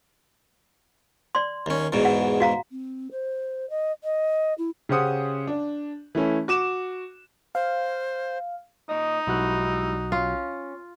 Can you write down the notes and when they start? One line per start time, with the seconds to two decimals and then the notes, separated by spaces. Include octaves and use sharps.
1.35 D5 C6
1.66 D#2 C#4
1.92 E2 G#2 B2
2.05 F#5
2.40 F#4 F5 A#5
2.71 C4
3.11 C5
3.69 D#5
4.03 D#5
4.58 E4
4.89 C#3 C#4 G4 C5 F#5 D#6
5.47 D4
6.15 E3 A3 C#4 E4
6.48 F#4 D6 E7
7.55 C5 F5
8.89 A#2 D#4 D#5
9.27 B1 G#2 G3 E4 F#4 F#6
10.12 C#4 F4